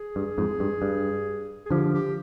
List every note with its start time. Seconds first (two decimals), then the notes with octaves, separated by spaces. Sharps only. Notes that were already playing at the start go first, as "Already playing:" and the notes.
Already playing: G#4
0.16 G2
0.38 F2 G#2
0.60 G2
0.82 G2
1.66 G#4
1.70 D3 F3 G4
1.94 G4